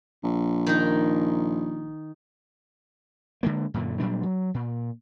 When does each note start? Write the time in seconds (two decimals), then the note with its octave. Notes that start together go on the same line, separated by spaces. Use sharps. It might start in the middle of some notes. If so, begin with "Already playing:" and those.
0.23 A#1
0.66 D#3 D#4
3.43 D3 G#3 A#3
3.74 F#2 A#2 D3
4.00 A#2 F#3 G3 D4
4.23 F#3
4.54 A#2